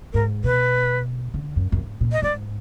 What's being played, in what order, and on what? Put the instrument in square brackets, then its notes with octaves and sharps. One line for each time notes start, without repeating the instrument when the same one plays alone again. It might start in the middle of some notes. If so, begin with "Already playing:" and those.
[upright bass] G#2 [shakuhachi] A#4
[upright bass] B2 [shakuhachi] B4
[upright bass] D3
F#2
F#2
G#2
A#2
[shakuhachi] D#5
[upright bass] G#2 [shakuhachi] D5